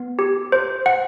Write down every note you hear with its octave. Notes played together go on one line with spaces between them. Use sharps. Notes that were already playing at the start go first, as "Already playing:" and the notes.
Already playing: B3
G4
C5
F#5